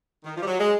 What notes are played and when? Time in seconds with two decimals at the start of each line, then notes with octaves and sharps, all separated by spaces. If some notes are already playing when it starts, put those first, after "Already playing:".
0.25 D#3
0.36 F3
0.42 G3
0.47 F#3
0.58 G#3